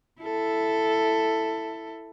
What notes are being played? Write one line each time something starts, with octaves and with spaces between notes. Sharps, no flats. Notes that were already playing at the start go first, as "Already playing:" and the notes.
E4 A4